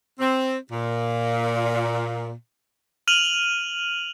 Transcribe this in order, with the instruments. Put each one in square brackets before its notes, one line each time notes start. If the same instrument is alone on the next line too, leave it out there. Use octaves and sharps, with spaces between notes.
[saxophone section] C4
A#2
[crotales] F6 D#7 F7 F#7